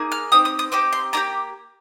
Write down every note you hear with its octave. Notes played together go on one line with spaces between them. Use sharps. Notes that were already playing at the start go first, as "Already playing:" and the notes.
Already playing: A#3 D#4 G#4
F6
C4 D#4 G4 D#6
D#6
D#6
C4 D#4 G4 D6
C6
A#3 D#4 G4 A#5